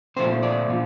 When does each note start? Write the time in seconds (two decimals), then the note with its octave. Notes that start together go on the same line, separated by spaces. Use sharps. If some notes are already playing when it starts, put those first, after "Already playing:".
0.16 A#2 F3 A3 C4 C5
0.43 D5
0.69 A#2 F3